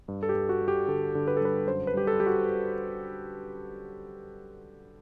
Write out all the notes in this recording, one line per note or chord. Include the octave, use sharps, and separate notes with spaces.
G2
A4
G4
G2
F#4
G3
G4
D3 A4
D3
B4
A4
G2 B4
F#2 C5
B4
G3 G4
A4
G3 G4
F#4